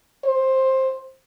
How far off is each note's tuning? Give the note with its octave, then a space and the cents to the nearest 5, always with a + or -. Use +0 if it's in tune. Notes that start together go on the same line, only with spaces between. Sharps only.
C5 +15